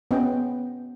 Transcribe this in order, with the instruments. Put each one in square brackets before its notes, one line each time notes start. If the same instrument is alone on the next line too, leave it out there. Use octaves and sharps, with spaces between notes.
[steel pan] B3 C#4 F#4 C5 D#5 G5